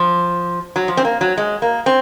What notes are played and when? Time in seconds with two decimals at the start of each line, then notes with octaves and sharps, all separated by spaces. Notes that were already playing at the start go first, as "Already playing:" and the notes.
Already playing: F3
0.76 F#3
0.88 F3
0.97 C4
1.05 A#3
1.21 F#3
1.38 G#3
1.62 A#3
1.86 C4